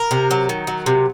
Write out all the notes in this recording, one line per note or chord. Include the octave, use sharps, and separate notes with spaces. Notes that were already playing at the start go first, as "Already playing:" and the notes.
Already playing: A#4
C3
F#3
D#3
F#3
C3